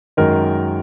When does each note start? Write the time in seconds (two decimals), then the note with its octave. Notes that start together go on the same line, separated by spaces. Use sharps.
0.17 F#2 D#3 G#3 A#4